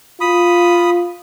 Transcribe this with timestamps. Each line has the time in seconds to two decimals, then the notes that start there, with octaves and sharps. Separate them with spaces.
0.21 F4 B5 D#6